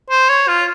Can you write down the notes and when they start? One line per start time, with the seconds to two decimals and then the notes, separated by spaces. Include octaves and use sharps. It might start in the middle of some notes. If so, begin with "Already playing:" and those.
0.10 C5
0.29 C#5
0.48 F4